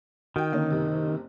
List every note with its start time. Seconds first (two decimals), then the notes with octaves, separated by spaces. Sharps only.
0.36 D#3 F#4 G5
0.52 D3 A#3 C#4
0.70 F#1 C3